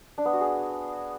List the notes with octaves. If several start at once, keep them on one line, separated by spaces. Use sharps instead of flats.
D4
B3
F#4
G#4